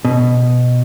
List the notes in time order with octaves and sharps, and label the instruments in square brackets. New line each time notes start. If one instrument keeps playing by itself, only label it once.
[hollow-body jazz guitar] B2